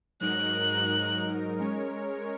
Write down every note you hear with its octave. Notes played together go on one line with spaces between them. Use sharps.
G#2 F#3 D#4 A#4 F#6
G#3 C#4 A#4 C#5